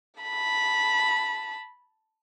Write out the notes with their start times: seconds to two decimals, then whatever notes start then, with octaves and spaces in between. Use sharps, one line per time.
0.21 A5 B5